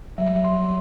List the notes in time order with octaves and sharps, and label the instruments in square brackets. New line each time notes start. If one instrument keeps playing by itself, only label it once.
[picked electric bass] F#3 G3 [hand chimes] E5
[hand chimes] C6